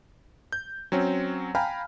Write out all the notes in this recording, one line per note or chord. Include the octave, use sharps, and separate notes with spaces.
G6
F#3 C4 C#4
F5 G5 G#5 A#5 B5 F6